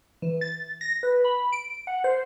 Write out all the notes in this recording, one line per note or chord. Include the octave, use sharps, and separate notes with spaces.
E3
A6
A#6
B4
B5
D7
F#5
C5